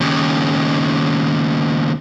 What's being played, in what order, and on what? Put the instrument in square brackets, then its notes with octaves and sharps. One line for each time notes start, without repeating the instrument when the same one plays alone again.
[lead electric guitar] D#2 C#3